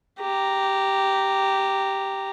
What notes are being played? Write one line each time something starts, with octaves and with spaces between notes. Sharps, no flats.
G4 A#5